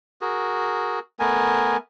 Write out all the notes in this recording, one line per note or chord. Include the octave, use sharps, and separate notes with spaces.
F#4 G#4 A#4
A3 B3 A#4 G#5